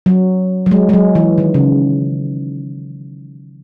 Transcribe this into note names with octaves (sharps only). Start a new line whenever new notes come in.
F#3
F#3
G#3
G#3
F#3
E3
D#3
C#3